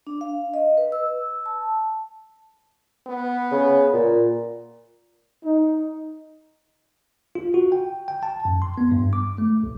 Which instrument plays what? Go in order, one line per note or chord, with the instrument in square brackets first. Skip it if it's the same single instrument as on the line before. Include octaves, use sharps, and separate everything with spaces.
[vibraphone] D4
F5
D#5
B4
E6
A5
[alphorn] B3
[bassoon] C#3
A#2
[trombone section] D#4
[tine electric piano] F4
F#4
G5
G5
A5
F#2
C6
B3
G2
D6
A3
B1